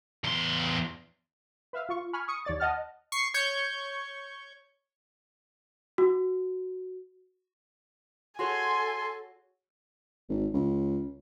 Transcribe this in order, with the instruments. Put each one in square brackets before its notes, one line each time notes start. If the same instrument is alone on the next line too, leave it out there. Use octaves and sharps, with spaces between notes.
[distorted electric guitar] E2 C6
[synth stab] B4 E5 F5
F4 C#6
G#5 B5 C#6 F6
C#6 D#6 C#7
D#2 C#5 D5 A6
D#5 F#5 A5 F6
[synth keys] C#6 C7
C#5 C#6 G6
[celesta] F#4
[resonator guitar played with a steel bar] F#4 G#4 C#5 [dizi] A4 [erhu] G#5 [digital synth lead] C6
[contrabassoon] G#1
C#2